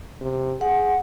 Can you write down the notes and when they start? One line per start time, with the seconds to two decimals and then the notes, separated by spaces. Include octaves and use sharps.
0.21 C3
0.61 G#4 F#5